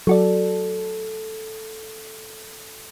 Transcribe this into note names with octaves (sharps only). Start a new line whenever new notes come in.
F#3 F#4 A4 D5